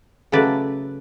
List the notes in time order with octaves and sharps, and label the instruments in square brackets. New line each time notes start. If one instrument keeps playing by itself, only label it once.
[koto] C#3 F#3 A3 B4 D5